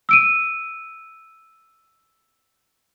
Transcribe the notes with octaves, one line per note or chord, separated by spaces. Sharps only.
E6 D7 D#7